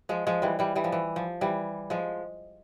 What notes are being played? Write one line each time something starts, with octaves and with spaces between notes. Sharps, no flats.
F3 G#3
F3 G#3
E3 G3
E3 G3
E3 G3
F3
E3
F3
E3 G3
F3 G#3